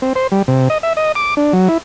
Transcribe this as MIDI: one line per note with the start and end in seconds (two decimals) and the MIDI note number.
0.02 0.13 60
0.16 0.27 72
0.32 0.42 55
0.48 0.69 48
0.70 0.78 75
0.83 0.93 76
0.97 1.12 75
1.15 1.34 86
1.37 1.53 62
1.53 1.68 54
1.68 1.78 64